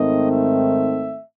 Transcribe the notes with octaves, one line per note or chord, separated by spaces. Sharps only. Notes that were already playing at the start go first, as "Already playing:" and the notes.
Already playing: G#2 D#3 A3 C4 D#5
E5